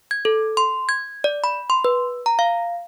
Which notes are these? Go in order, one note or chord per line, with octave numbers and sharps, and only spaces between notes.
G#6
A4
C6
G#6
D5
B5
C6
B4
A#5
F5